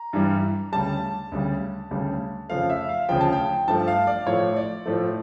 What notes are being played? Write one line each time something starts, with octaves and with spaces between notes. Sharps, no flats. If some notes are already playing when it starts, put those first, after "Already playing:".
Already playing: A#5
G2 E3 G3
D2 C#3 G3 A5
D2 C#3 G3
D2 C#3 G3
F2 C#3 F3 A3 F5
E5
F5
D2 C#3 F3 G5
A5
G5
G2 F3 A3 A5
F5
D5
A2 F3 A3 C#5
D5
A2 F3 A3